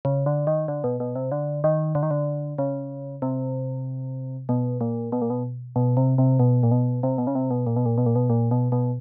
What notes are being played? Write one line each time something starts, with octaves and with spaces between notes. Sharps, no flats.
C#3
D3
D#3
D3
B2
B2
C3
D3
D#3
D3
D#3
D3
C#3
C3
B2
A#2
B2
A#2
B2
B2
C3
C3
B2
A#2
B2
C3
B2
C#3
C3
B2
A#2
B2
A#2
B2
A#2
B2
A#2
B2
B2